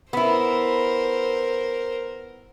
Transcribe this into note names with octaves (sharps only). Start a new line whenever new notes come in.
B3 E4 A#4 C5